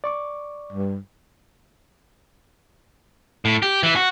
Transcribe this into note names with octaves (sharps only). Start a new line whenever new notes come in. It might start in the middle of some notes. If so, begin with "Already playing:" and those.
D5 C#6 D6
G2
A2
G4
E3
F#4